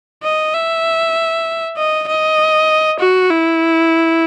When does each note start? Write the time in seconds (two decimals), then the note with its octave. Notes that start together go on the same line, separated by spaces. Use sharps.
0.24 D#5
0.54 E5
1.77 D#5
2.08 D#5
3.00 F#4
3.31 E4